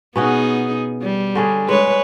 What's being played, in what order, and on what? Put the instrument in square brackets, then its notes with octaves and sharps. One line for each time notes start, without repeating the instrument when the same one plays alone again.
[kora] B2 C#4 F#4 [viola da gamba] B3 D#4 G#4
[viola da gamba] G3
[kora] D3 C#4 G#4
[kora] G#3 [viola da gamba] B4 C#5